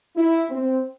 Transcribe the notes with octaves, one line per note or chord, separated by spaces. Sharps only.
E4
C4